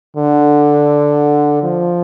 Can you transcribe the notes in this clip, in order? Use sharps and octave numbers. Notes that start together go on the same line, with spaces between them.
D3
F3